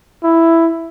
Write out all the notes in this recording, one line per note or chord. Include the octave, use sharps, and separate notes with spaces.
E4